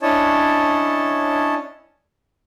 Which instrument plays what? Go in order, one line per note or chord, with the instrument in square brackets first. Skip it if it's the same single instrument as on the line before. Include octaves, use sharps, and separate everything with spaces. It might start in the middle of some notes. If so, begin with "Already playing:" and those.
[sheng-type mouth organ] C#4 D4 E4 C#5 D#5 A5